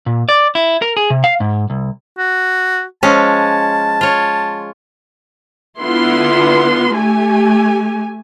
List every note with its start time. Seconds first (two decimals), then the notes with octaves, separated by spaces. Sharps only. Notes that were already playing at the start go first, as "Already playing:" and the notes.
0.06 A#2
0.29 D5
0.55 E4
0.82 A#4
0.97 G#4
1.10 C3
1.24 F5
1.40 G#2
1.70 C2
2.18 F#4
3.03 F3 G#3 C#4 A5
4.01 F4 C#5
5.80 D3 B3 E4 F4 C6
6.95 A3 G4 G#5